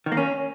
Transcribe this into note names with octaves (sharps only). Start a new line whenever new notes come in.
D#3
A#3
C#4